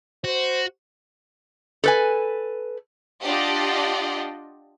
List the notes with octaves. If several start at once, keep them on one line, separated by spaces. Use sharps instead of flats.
F#4 C5
A4 B4 G#5
D4 F4 G4 D5 D#5 F#5